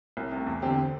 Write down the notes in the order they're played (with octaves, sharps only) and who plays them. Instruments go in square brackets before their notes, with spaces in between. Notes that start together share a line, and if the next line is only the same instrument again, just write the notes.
[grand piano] C2
C3 A3
E2
D3 C4 G4